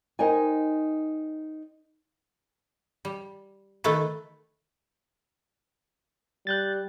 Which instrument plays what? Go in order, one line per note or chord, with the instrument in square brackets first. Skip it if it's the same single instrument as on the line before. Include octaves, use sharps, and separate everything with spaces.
[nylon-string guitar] D#4 A#4 C5 D#5 G5 G#5
[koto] G3
D#3 A3 E4 A4 B4
[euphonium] G3 [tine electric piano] F#6 G6 A6